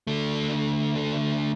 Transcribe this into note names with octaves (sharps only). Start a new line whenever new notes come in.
D3 A3